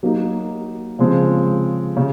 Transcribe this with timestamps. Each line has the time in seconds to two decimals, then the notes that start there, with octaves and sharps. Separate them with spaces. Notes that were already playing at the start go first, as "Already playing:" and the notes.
0.03 F#3 A#3 D#4
0.99 C#3 F3 G#3 C4
1.97 C#3